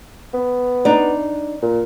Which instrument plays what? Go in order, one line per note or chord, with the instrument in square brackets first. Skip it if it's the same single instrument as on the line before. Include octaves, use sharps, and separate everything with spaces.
[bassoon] B3
[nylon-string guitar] D4 D#4
[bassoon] A#2